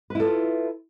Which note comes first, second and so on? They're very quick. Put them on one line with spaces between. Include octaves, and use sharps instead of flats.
B4 E4 A4 F4